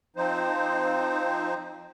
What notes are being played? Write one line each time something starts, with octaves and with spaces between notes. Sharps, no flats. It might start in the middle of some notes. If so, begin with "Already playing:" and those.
F3 C4 D#4 C5